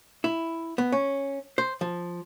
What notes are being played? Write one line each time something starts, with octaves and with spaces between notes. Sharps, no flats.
E4
B3
C#4
C5
F3